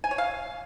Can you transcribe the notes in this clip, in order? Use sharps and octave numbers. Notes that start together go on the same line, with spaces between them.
G#5
C#5
F5